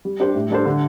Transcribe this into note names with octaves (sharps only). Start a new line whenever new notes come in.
G3
D4 G4 C5
A2
G3 D4 A4 C5
D3